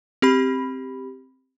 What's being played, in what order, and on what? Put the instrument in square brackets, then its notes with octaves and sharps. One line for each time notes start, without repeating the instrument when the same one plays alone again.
[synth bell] C4 G4 B5